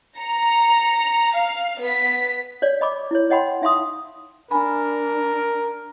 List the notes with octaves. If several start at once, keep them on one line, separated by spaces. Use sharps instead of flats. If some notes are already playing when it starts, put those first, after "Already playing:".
A#5 C#7
F5
B3 B6
C#5 D5
D#5 B5 D6
E4 C#5
C#5 D#5 F#5 G5 B5 C6
D#4 E5 F5 C6 D#6
D4 A#4 G#5 B5